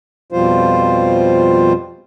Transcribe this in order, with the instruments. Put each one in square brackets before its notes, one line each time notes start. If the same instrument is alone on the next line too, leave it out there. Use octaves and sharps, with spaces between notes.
[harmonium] F2 B2 F3 G3 F4 C5